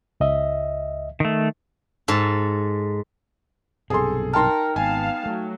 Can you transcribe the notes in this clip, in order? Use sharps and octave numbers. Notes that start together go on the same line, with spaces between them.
C#2 D#5 E5
D#3 A3
G#2 A4
B1 G2 C3 G#4 A4 C6
D#4 A#4 G5 A5 C6 F6
G#1 B3 F5 G#5 A5
F#3 A3